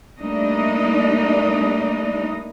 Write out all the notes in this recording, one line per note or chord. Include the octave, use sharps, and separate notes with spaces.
G3 A3 A#3 D4 D#4 D#5